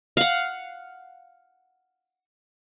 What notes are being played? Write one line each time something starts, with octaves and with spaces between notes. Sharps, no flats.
F5 F#5